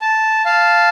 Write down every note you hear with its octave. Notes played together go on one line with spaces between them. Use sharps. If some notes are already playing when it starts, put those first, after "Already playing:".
A5
F5 A5